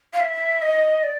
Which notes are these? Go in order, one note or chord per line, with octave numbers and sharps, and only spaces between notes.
F5
E5
D#5
D5